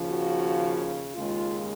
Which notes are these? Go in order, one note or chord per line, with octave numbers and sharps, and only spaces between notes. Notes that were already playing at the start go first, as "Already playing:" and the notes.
Already playing: D#2 C#3 F3
F#4
D#2 C#3 G#3 F4